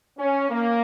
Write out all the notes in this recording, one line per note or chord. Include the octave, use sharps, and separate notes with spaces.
C#4
A#3